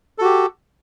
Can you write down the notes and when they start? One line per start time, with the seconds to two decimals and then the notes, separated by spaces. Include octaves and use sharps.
0.18 A4
0.21 F#4
0.24 G4